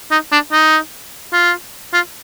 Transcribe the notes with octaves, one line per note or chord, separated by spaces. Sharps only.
D#4
D4
D#4
F4
F4